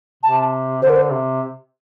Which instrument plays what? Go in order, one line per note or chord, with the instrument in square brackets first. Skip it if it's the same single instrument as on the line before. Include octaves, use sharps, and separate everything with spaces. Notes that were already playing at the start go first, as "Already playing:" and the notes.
[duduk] C3 [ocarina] A5
[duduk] D3 [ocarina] C5
[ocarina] A#4
C5
[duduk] C3